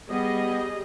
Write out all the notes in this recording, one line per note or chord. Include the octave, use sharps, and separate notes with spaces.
G3 B3 G#4 D#5